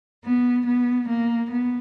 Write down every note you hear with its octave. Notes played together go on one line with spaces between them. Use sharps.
B3
B3
A#3
B3